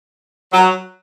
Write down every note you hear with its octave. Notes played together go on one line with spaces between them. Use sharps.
F#3